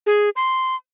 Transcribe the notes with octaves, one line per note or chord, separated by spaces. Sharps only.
G#4
C6